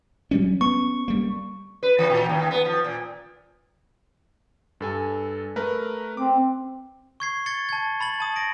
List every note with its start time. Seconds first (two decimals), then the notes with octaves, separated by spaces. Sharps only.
0.31 F#3 G3 C#4
0.61 B3 C#4 C#6
1.08 G3 A#3
1.83 B4
1.99 E3
2.10 A#2
2.29 D#2
2.51 B3
2.65 F3
2.84 A#2
4.80 G2 A4 G#5
5.56 A3 A#4 B4
6.17 C4 D6
7.20 C#6 G#6 C7
7.46 G#6 A6 C#7 G7
7.69 A5 G#6
8.00 B5 A6 F#7
8.20 A5 D#6
8.36 A#6 D7